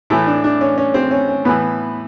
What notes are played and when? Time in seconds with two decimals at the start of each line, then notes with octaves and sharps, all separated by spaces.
0.10 A2 E3 A3
0.27 D4
0.44 D4
0.61 C#4
0.78 C#4
0.94 C4
1.11 C#4
1.28 C#4
1.45 A2 E3 B3